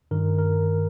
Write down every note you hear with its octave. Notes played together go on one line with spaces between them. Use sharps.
G2 D#3 A#4
A#4